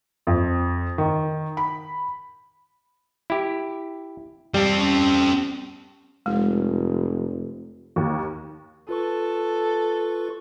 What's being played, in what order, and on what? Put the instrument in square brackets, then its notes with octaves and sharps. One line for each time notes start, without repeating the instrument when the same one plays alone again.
[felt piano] F2
D#3
B5
[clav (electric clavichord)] E4 G4
[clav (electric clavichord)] G3 [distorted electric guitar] C4 A4
[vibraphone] C#4
[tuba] F1 [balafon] G#3 A3 D#4
[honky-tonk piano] D#2
[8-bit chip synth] F4 B4 C#6 [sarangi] A4